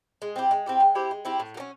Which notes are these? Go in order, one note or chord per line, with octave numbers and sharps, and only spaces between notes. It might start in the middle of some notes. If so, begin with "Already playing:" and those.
G#3
C4 E4 G4
G#3
C4 E4 G4
G#3
C4 E4 G4
G#3
C4 E4 G4
A2
F#3 A#3
C#4